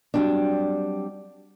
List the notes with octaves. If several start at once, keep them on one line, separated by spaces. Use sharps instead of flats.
F#3 G3 C4 D4